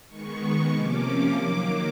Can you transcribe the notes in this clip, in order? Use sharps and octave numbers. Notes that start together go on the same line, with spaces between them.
D#3 G#3 B3 C#6
C3 F3 A#3 C#4 D6
D#3 F#3 A#3